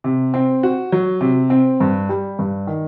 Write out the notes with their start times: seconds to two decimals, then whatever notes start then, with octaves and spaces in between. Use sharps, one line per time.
0.04 C3
0.34 C4
0.63 F#4
0.92 F#3
1.21 C3
1.50 C4
1.80 G2
2.09 G3
2.39 G2
2.67 D#3